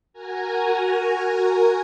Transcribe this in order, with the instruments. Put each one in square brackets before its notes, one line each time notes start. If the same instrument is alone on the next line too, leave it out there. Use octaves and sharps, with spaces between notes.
[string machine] F#4 A#4 G#5 A#5